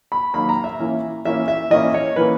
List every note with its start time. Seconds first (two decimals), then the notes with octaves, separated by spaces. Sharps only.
0.12 B5
0.34 D#3 F#3 A#3 B5
0.49 A#5
0.64 E5
0.79 E3 A#3 C#4
1.25 E3 A#3 C#4 E5
1.48 E5
1.70 E3 A#3 C#4 D#5
1.94 C#5
2.16 E3 A#3 C#4 B4